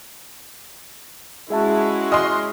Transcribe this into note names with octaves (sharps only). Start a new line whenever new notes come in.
G#3 C#4 E4 F#4 G#4 E5 A5
D#5 G#5 C6 D#6 F6